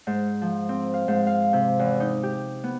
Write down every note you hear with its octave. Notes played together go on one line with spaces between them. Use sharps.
G#2
F3
C4
F5
G#2
F5
C3
E2
D#4
G4
B3